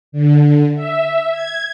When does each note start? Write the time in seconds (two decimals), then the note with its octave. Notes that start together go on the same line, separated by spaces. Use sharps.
0.12 D3
0.75 E5
1.31 G#6